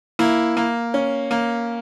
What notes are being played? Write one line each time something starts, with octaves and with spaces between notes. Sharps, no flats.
A#3 E4
A#3
C#4
A#3